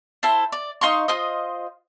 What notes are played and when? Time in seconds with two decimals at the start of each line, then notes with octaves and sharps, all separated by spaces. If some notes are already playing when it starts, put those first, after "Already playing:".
0.23 E4 A4 C5
0.52 D5
0.81 D#4 F5 C6 C#6
1.08 F4 C5 D#5